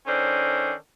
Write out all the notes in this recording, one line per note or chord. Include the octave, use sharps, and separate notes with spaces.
D#3 C#4 D4 A4 A#4 C5